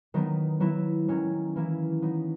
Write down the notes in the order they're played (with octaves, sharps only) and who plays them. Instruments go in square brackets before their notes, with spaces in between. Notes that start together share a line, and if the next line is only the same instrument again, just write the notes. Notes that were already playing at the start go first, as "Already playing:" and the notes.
[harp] D#3 F#3 B3 D#4
F#3 B3 E4
D#3 F#3 C#4
E3 A#3 C#4 E4
F#3 B3 D#4